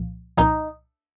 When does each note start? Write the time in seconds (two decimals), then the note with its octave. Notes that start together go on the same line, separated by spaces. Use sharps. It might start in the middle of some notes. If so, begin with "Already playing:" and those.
Already playing: C2 A#2 F3
0.37 C2 A#2 F3 D#4